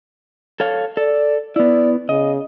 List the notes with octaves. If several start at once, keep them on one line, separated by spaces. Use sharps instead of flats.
A4 C#5 F5
A4 D5
B3 E4 D5
C#3 D#5